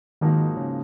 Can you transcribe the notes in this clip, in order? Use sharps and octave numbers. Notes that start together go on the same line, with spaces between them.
G#2 D#3 F3 A#3 D#4 F#4
C#3